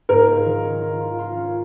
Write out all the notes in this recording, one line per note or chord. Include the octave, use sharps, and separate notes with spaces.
G#2 A#4
F4
D#3
C#4
F4
F4
F4
C#4